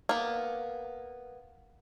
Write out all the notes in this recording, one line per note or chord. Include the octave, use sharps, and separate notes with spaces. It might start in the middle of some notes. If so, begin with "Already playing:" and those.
A#3 B3